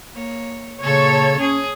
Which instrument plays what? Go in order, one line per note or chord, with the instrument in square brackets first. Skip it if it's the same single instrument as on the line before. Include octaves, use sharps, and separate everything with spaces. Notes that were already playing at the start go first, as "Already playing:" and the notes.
[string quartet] A#3 C#5
[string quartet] A#2 A4 A5 [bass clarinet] C#3 [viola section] C#5
[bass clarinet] C#4 [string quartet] G#4